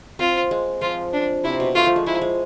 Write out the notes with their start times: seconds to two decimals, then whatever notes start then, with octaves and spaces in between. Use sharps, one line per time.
0.19 C4 F4
0.51 G#3
0.81 F3 F4
1.13 D4
1.44 C3 E4
1.60 B2
1.75 A3 F4
1.86 F3
1.96 G#3
2.06 G#3 E4
2.21 G#3